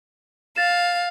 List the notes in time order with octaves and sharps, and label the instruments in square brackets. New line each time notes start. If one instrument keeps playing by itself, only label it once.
[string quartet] F5 [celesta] A6 E7